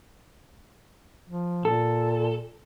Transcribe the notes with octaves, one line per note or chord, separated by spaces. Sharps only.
F3
A#2 A4